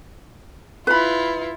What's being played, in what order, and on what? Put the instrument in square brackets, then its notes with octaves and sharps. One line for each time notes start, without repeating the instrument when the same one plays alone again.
[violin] E4 F4 [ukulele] B4 B5